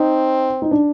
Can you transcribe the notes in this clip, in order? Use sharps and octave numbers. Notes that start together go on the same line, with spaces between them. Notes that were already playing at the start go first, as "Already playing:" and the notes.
Already playing: C4 D#4
D#4
D4